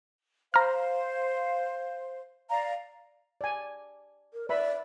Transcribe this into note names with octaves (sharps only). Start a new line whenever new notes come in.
C5 F5 A#5 F6
D5 F5 A#5
D5 G#5
A#4
B4 D5 E5 B5